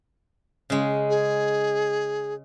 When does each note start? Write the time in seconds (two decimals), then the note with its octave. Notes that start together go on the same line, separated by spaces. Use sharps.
0.70 C#3 G#3
1.09 G#4